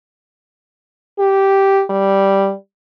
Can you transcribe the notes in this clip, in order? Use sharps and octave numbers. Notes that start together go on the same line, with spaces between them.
G4
G3